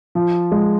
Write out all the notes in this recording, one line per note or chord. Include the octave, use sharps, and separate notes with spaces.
F3
G#3